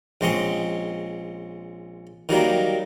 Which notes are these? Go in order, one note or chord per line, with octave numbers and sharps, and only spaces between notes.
A#1 G#3 C4 C#4 D#5
D#3 F#3 G3 A#3